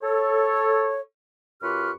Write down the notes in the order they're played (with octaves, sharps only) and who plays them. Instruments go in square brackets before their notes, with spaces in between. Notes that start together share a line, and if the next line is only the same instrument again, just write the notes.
[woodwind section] A4 C#5
F#2 F4 G4 B4 C#6 F6